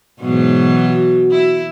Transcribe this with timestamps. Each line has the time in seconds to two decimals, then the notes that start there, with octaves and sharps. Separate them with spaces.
0.20 G#2 B2 E3 F#3
0.89 F#4
1.31 E4